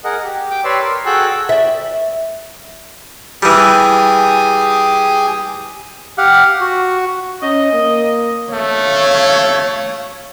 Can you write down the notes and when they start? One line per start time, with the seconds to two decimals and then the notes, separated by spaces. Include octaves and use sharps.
0.04 G#4 A#4 D#5 F#5
0.24 G4
0.50 G5 D6
0.65 G4 B4 C#5 D5 C6 E6
0.81 A#4 C6
1.06 F#4 G#4 A4 G5 E6 F#6
1.49 D5 E5
3.43 E3 G3 G4 G#4 G#5
6.18 G4 F5 F#5
6.61 F#4
7.43 C#4 D#5
7.73 A#3
8.53 A3 C#5 F5